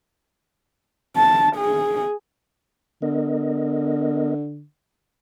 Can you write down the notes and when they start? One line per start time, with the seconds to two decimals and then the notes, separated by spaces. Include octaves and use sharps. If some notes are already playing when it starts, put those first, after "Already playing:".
1.16 A5
1.56 G#4
3.02 D3 B3 A#4 D#5